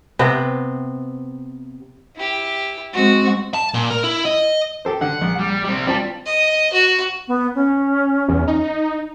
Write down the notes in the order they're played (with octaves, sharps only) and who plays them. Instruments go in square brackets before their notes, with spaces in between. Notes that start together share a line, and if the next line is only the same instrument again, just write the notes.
[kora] C3 B3 C4
[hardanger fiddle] E4 G4
[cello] G#3 C4 [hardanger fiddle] F#4
[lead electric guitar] A5
A#2
A#4
E4
D#5
[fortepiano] G4 A4 C5
[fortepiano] D3 [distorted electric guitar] F#5
[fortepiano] A#1
[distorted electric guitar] G3
G3 C4
[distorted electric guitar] G3 [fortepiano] C4 F4 A5
[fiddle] D#5
F#4
[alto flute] B3
C#4
[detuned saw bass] E2
D#4